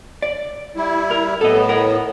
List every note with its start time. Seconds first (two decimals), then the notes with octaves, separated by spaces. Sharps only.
0.22 D5
0.76 G3 E4
1.11 A#4
1.41 A2 B3 A4 D#5
1.69 A#4 F#5